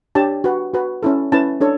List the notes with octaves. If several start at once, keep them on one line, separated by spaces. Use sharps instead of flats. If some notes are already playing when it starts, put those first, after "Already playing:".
D4 G4 C#5 A5
F#4 B4
F#4 B4
C#4 E4 A4
C#4 E4 B4 A5
D4 A4 C#5